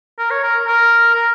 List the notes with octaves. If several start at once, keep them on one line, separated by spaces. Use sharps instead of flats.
A#4
C#5
A#4
A#4
A#4